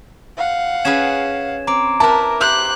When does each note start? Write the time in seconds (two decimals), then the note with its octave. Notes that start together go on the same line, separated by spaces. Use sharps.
0.37 F5 F#5
0.85 C#4 G#4 B4 G#6 E7
1.67 C4 A#5 D6 D7
2.00 E4 A#4 B4 A5
2.41 E4 G4 C5 F#6